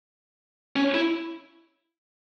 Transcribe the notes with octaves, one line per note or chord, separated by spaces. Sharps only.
C#4
E4